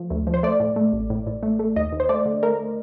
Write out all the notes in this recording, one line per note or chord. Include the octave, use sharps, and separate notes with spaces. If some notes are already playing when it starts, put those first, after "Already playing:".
Already playing: F3 A3
D2
F3
C5
A3 D5
A2
A3
A1
A2
A2
A3
A3
D#2 D#5
D#2
C5
A3 D5
D3
A3 A#4